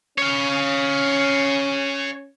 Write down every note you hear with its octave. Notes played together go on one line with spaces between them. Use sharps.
C#4 C#5 F5